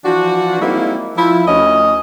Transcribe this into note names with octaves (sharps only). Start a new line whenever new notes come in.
E3 F3 D4 F#4
G3 G#3 A#3 C4 D#4 E4
F3 E4
D2 C#4 D#5